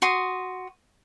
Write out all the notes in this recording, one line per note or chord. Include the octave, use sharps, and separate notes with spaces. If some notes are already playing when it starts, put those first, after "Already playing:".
F#4 C6 D#6